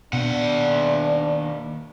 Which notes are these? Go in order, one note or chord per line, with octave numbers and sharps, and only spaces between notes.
D#2 B2 D4 F#5